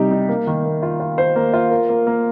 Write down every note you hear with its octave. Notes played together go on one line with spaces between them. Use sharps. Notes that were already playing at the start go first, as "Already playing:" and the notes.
Already playing: C3 G3 D#4 G4
D#4
A#3
D#3
A#3
F4
F4
C5
A#3
F4
A#4
A#3
A#3